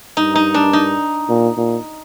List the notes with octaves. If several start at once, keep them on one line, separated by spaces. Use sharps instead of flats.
G2 D#4
D#4
D4
D#4
A#2
A#2